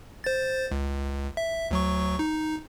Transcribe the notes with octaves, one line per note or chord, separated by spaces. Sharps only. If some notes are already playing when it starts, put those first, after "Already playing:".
C5 A6
C#2
E5
D2 F#3 C#6
D#4